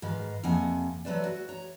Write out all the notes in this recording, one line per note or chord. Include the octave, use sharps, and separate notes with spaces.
G#2 D#3 B4 D#5 F5
F2 C3 A#3 F#5 G#5
F#3 A3 B4 C5 D5
F#4
C#5 A#5